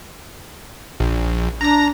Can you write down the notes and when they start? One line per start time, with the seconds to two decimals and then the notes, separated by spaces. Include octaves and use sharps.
1.00 A#1
1.61 D4 A#5 A#6